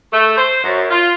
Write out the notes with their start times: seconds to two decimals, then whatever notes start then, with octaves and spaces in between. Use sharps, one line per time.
0.13 A3
0.37 C5
0.63 F#2
0.91 F4